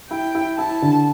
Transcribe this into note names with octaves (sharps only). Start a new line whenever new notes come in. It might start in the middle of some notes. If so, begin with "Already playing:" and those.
E4 G5
E4
E4 A5
D3